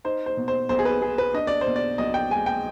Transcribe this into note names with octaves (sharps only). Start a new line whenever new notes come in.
D#4 C5
C5
B2
C5
B1 C5
G#4
B4
B3 G#4
B4
D4 D#5
D5
C5
B2
D5
B1 D#5
G5
G#3 G#5
G5